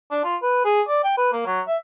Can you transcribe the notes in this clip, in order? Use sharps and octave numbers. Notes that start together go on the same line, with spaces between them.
D4
F4
B4
G#4
D5
G5
B4
A#3
F#3
E5